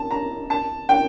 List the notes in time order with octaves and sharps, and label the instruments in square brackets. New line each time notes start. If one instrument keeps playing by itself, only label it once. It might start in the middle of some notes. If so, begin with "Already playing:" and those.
Already playing: [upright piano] A5
A#5
A5
G5